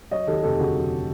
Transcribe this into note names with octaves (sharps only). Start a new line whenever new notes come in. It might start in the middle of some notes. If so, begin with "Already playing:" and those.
F#3 C#5 D#5
D#2 G4 A4
F1 G4 A4
D3 F#4 G#4
F#3